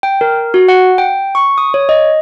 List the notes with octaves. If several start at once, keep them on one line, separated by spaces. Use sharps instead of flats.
G5
A#4
F#4
F#5
G5
C#6
D#6
C#5
D#5